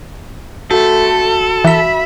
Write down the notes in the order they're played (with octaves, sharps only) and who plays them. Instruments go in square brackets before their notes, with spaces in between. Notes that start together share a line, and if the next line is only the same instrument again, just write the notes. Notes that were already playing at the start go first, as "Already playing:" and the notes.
[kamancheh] A3 [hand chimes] F#4 [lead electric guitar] A4
[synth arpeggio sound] E3 B6 [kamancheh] E5 B5